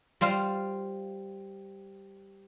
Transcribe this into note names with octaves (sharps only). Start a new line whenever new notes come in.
G3 F4 C5 F5